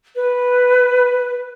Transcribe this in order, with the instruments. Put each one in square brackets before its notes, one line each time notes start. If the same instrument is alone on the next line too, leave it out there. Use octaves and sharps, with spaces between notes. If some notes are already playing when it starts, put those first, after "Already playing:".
[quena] B4